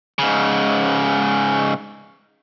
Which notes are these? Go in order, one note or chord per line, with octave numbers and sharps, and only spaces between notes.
G#2 C#3